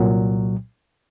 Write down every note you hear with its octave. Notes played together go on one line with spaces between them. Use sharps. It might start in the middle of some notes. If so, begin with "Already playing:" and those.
Already playing: C2 A#2 F#3